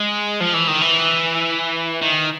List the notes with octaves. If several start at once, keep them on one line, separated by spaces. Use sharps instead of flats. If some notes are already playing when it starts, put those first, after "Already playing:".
Already playing: G#3
F3
E3
D#3
E3
D#3